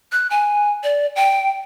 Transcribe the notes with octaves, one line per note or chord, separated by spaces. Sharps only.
F#6
G#5
D5
G5